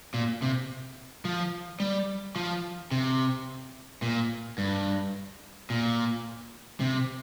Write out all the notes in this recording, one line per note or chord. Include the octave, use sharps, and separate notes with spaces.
A#2
C3
F3
G3
F3
C3
A#2
G2
A#2
C3